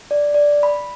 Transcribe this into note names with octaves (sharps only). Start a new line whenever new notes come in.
D5
D5
B5